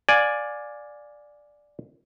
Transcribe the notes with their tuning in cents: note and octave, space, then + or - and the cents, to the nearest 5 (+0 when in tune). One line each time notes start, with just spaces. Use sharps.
D5 +0 F5 +25 G#5 +0